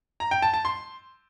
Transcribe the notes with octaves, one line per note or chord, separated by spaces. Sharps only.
A#5
G5
A5
A5
C6